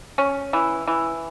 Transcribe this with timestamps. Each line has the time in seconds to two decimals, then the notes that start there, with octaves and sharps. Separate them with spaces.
0.18 C#4
0.53 E3
0.87 E3